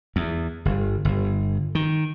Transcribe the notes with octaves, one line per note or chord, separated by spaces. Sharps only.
E2
G1
G1
D#3